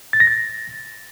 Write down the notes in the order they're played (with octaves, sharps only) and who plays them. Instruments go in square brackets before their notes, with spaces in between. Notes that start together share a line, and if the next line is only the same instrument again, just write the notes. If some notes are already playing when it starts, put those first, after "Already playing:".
[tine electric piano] A6
A#6
A6